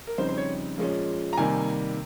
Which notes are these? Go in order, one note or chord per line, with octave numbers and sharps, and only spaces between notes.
A#4
F2 C#3 G3 C4 D#4 C5
C5
C#5
A#2 F3 G#3 C#4
A#5
C3 D#3 G3 A#3 G#5